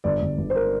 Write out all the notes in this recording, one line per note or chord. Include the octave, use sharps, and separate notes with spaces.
G1 D5
G1
G1
C5
A#4